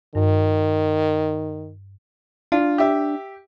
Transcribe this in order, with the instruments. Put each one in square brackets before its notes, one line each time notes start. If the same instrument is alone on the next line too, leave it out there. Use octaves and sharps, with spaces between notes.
[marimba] G2 [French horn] D#3
[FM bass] D4 [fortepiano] F4
[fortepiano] G4 E5